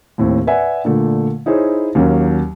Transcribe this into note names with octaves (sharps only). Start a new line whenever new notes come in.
D#2 A2 C4
B4 D5 E5 F#5 G#5
A#2 D3 A3
D#4 E4 G#4 C5 C#5
D#2 F#3 A#3 C#4